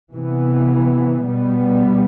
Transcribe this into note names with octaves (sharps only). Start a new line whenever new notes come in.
C3 E3 B3
B2 G3 B3